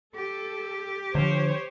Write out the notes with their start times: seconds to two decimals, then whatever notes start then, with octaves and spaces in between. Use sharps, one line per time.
0.16 G4 A4
1.15 D3 F3 C5 C#5